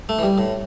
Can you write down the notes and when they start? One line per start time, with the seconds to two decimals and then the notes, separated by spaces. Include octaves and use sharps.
0.09 A3
0.19 E3
0.23 G3
0.38 A2